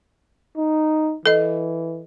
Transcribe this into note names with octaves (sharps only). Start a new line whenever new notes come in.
D#4
E3 A4 D#5